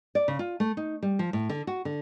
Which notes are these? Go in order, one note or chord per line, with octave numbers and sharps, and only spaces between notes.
D5
C#3
F4
A3
D#4
G3
F3
A2
D3
F#4
D3